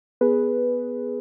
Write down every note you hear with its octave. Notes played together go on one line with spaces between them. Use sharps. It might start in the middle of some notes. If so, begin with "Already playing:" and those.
B3 G#4 B4